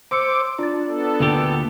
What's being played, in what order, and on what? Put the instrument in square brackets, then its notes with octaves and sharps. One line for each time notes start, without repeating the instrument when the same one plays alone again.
[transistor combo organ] C5 D6 [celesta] C6 E6 C#7
[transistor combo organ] D4 [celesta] F4 A6
[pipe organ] B3 A4
[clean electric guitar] D2 A#2 G4